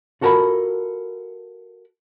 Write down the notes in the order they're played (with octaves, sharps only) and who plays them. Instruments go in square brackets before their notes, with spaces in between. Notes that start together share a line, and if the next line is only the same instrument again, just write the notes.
[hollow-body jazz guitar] F4 F#4 A4 A#4 F#5 B5